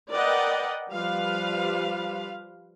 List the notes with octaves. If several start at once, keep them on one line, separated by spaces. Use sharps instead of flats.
A#4 B4 D5 D#5 F#5 G5
F3 G3 B4 F5